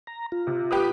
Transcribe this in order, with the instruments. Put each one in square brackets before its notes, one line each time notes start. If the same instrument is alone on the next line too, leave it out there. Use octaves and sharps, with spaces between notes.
[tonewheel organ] A#5
F4
[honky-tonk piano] C3
G4 B4 D#6